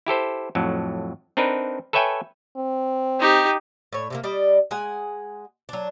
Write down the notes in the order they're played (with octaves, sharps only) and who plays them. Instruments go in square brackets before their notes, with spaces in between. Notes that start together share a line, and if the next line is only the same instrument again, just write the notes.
[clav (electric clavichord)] E4 G4 A4 C5
F2 A2 F#3
C4 D4 D#4 A#4 B4
A4 B4 C#5 E5 G5 G#5
[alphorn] C4
[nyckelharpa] D#4 G4
[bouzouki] A2 C#5
C3 D#3 A#3
G3 D5 D#5
G#3 F#5 G#5
F#3 D4